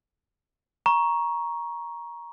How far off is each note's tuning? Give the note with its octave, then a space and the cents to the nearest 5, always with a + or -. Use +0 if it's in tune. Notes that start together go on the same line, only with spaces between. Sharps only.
A#5 +15 C#6 +0